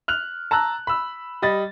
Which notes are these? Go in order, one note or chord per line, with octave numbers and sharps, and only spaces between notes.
F6 F#6 F7
A5 A#5 E6 F#6
B5 E6
G3 D#5 B5 A6